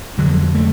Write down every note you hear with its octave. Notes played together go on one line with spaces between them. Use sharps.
F2 D3 F#3
A3